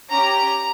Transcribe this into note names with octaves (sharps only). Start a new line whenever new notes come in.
C#4 G4 A#5